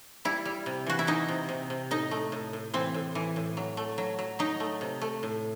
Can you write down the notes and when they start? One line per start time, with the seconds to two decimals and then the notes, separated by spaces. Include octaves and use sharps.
0.25 G3 E4
0.45 G3
0.66 C3
0.86 E3 F#4
0.99 E4
1.07 E3 D#4
1.28 C3
1.49 C3
1.70 C3
1.91 A2 D#4
2.11 A3
2.32 A2
2.53 A2
2.74 E3 C4
2.94 A2
3.15 E3
3.36 A2
3.57 F#3
3.77 A3
3.98 F#3
4.19 F#3
4.39 F#3 D#4
4.60 A3
4.81 C3
5.01 A3
5.23 A2